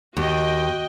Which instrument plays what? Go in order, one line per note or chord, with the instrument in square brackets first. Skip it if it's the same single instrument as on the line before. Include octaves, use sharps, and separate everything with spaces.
[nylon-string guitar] D#2 [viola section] F#4 D#5 G5